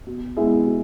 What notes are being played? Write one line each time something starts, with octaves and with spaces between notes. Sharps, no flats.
B2
G#3 B3 E4 G#4
B2